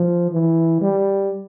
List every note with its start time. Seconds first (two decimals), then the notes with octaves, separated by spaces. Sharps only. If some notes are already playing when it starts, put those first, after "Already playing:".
Already playing: F3
0.31 E3
0.81 G3